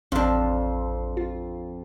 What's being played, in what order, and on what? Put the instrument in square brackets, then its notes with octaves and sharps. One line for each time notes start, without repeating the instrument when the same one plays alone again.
[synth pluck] A1 C4 C6 [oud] F2 D4
[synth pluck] F4